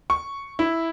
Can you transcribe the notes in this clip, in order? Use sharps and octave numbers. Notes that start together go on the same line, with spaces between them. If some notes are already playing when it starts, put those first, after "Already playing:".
C#6
E4